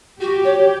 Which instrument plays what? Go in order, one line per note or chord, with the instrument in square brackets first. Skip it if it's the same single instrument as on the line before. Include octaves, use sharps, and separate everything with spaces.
[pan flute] F#4 [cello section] G4
[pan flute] C#5